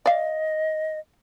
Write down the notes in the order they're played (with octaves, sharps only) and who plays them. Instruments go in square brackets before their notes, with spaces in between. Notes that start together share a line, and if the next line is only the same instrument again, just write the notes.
[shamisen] D5 F5 [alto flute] D#5